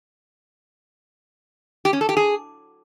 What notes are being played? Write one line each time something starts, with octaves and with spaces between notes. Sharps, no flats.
G4
C#4
A4
G4
G#4